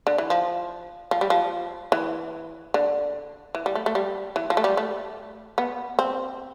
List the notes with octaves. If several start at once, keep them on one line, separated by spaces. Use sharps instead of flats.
D3
E3
F3
F3
G3
F3
E3
D3
E3
G3
A3
A3
G3
E3
F3
A3
G3
A3
B3
C4